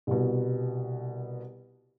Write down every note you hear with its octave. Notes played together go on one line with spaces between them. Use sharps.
C2 B2